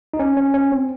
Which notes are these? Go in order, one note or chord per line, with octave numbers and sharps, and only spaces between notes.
D#4
C#4
C#4
C#4
C4